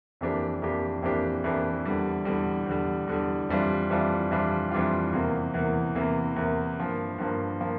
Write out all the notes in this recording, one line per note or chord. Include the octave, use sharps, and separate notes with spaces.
F2 E3 A#3 D4 G4
F2 E3 A#3 D4 G4
F2 E3 A#3 D4 G4
F2 E3 A#3 D4 G4
E2 D3 G3
E2 D3 G3
E2 D3 G3
E2 D3 G3
F2 E3 G3 D4 F4
F2 E3 G3 D4 F4
F2 E3 G3 D4 F4
F2 E3 G3 D4 F4
E2 C3 E3 A#3
E2 C3 E3 A#3
E2 C3 E3 A#3
E2 C3 E3 A#3
G2 F3 A#3
G2 F3 A#3
F3 A#3